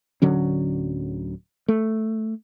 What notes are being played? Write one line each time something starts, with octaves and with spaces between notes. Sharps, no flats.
D1 D3 F#3 C#4
A3